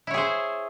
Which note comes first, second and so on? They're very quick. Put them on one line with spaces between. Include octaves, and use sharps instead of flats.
E4 C#5 G#4 C5